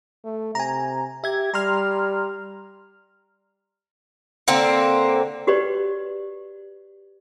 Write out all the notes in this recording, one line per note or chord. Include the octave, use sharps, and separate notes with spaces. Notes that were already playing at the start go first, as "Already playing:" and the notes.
A3
C3 G#5 A#5
G4 E5 G#6
G3 A#5 C6 F6
D3 A#3 C4
F#4 G4 B4 C#5 D5